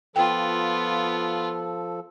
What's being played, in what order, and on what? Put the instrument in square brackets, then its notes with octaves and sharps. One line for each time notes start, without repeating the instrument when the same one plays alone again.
[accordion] F3 A4 [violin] B3 F4 [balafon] G5